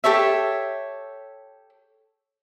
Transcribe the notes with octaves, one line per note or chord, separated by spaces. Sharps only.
G4 A4 C#5 E5